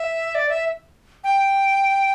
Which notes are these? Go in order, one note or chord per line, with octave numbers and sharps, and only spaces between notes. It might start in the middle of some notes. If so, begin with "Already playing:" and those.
Already playing: E5
D5
E5
G5